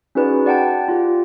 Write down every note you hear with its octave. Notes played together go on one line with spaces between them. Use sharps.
C#4 D#4 F#4 G#4 B4 D5
D5 F#5 G5 A5
F4 G4